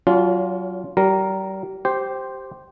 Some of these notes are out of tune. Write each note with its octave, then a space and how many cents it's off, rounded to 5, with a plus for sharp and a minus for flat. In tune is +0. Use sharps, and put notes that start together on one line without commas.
F#3 +15 C#4 +45 F4 +0
G3 -35 A#4 +0
G4 -10 C5 +0